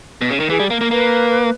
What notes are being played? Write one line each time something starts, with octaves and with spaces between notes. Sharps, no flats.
B2
C#3
D#3
E3 G#4
G3
A#3 A#4
A#3
A#3 B4